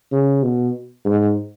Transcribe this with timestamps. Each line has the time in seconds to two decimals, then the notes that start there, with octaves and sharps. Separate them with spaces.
0.12 C#3
0.43 B2
1.05 G#2